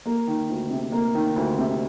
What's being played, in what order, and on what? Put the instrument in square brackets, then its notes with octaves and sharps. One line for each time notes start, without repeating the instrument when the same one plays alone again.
[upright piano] A#3
D#3
D2
C3
A#3
D#3
D2
C3